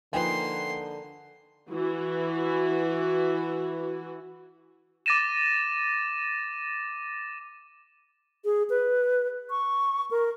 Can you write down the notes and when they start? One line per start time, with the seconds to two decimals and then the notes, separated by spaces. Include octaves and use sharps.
0.13 D3 F3 A#3 D#4 B4 G5 G#5 C6
1.69 E3 F#4
5.06 D6 A6 A#6 D#7 E7
8.45 G#4
8.70 B4
9.50 C#6
10.11 A#4